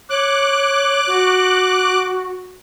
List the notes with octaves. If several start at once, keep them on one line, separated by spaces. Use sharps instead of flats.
C#5 D6 F#6
F#4